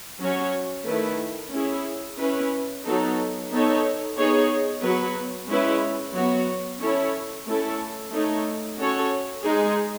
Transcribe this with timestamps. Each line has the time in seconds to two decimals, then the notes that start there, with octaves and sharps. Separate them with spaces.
0.21 F#3 C#4 F#4 C#5
0.86 D#3 A3 E4 B4
1.52 C#4 E4 G#4
2.18 C#4 E4 B4
2.85 F#3 B3 D#4 A4
3.51 B3 D#4 A4 C#5
4.17 B3 D#4 G#4 C#5
4.83 F#3 B3 F#4 B4
5.49 G#3 C#4 E4 B4
6.14 F#3 B3 F#4 C#5
6.80 C#4 E4 A4 C#5
7.47 A3 C#4 E4 A4
8.12 A3 D#4 A4 C#5
8.79 C#4 F#4 A4 C#5
9.45 G#3 D#4 G#4